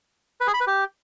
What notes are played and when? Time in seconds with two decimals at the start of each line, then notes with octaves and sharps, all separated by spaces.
0.41 B4
0.47 G#4
0.54 B5
0.60 B4
0.67 G4